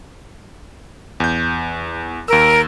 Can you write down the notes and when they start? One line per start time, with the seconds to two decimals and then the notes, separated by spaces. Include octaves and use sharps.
1.20 E2 G6
2.28 D#2 A#4 E6